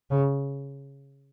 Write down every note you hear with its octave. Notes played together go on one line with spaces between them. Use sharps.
C#3